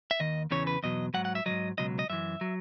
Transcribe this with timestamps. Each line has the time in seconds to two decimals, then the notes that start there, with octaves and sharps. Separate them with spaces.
0.11 E5
0.20 D#2 D#3 D#5
0.51 E2 C#3 E3 C#5
0.67 B4
0.83 E2 B2 F#3 D#5
1.14 G#2 F#3 F#5
1.25 F#5
1.35 E5
1.46 D#3 F#3 D#5
1.50 G#2
1.78 C#2 B2 F#3 D#5
1.99 D#5
2.10 F#2 E3 E5
2.41 F#3